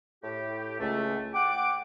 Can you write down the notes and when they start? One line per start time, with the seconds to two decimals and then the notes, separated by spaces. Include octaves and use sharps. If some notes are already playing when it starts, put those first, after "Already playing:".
0.24 A2 G4
0.80 C#2 A3
1.34 F#5 G5 D6